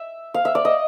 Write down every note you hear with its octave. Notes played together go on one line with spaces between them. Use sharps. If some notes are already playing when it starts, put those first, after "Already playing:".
Already playing: E5
F5
E5
D5
D#5